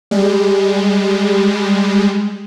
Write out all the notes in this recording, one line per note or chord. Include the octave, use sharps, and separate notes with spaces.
G3 G#3